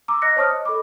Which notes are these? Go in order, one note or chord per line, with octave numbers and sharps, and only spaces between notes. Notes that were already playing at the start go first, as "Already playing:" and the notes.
A#5 D6 E6
D#5 F#6 A#6 C#7
C5 C#5 A5 C#6 D#6 F6
D#5
A4 D#5 B5 D6